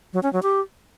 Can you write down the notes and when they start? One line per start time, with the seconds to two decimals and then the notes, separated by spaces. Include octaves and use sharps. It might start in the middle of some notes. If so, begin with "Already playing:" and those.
0.13 F#3
0.23 C#4
0.33 F#3
0.43 G4